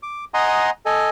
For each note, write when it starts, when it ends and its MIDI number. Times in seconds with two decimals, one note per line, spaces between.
0.03 0.25 86
0.34 0.70 75
0.34 0.70 78
0.34 0.70 80
0.34 0.70 82
0.34 0.70 84
0.34 0.70 87
0.86 1.10 69
0.86 1.10 75
0.86 1.10 80